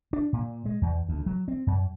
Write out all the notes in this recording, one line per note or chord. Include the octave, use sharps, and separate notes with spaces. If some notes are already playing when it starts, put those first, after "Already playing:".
D4
A#2
G#3
E2
D2
F#3
C4
F#2